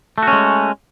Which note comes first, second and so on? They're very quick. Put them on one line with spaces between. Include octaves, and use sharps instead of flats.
A3 F#4 C#4 G#3